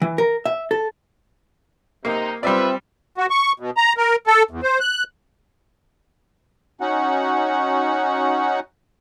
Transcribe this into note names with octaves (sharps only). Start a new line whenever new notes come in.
E3
A#4
E5
A4
C3 A#3 D#4
G3 C4 F4 B4 D5 E5
F#4
C#6
B2
A#5
A#4
A4
E2
C5
F#6
C#4 D#4 F#4 F#5